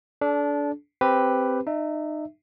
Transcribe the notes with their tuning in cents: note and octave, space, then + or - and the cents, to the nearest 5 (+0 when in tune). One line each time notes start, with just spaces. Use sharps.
D4 -20 A4 -40
C4 +0 G4 +0 B4 +5
D#4 -30 E5 -5